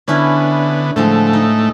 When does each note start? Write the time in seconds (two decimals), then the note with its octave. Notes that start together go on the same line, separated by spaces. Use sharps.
0.08 D3 B3 C#4 D4 E4
0.96 A2 D3 F3 G#3 A3
1.33 D#4